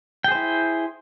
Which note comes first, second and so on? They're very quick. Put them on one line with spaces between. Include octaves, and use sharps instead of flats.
G5 G#4 C5 E4